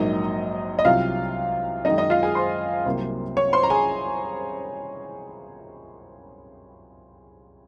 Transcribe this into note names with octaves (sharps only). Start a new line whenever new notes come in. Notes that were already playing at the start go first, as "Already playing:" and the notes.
Already playing: A#1 G#2 F#3 A#3 D#4 D#5
D#5
C2 C3 F#3 F4 F5
F#2 D#3 G#3 D#4 D#5
D#4 D#5
F4 F5
G#4 G#5
C5 C6
C2 C3 F#3 A#3
C#5 C#6
C5 C6
A#5
G#4 G#5